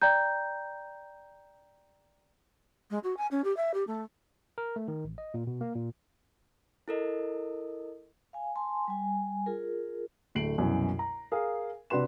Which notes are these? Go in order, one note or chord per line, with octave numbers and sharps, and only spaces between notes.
D5 G5 A#5 G6
G#3
F#4
G#5
C#4
G4
E5
G4
A3
A#4
A3
D#3
A1
D#5
A#2
B2
A#3
A#2
E4 A4 A#4 D#5
F5 G#5
G#5 A5 C6
G3 G#5
F4 G#4 A#4
D1 A3 C7 D7 F#7
C2 F#2 B2 E3
A#5
G#4 A#4 F5
C3 D4 F#4 B4 C6 E7